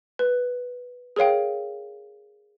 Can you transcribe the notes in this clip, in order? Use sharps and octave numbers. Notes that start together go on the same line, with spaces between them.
B4
G#4 A#4 C#5 F5 G5